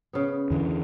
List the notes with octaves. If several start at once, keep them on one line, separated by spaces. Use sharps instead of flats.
C#3 B3
E2 D3 E3